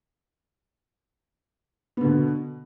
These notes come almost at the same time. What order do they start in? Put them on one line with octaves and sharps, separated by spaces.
B3 D3 B2